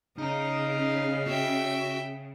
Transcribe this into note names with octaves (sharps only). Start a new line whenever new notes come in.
C#3 D#4 D#5 F5 A#5
F#4 E5 G5